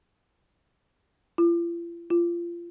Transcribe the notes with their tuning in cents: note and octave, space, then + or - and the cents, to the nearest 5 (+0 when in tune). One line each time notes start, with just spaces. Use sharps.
F4 -45
F4 -25